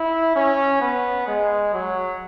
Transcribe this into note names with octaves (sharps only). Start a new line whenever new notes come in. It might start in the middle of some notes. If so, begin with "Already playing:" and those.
Already playing: E4
C#4
B3
G#3
F#3